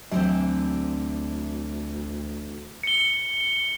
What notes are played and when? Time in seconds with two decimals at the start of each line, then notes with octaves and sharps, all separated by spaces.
0.12 D2 D3 E3 F#3 C4
2.83 C#7 G7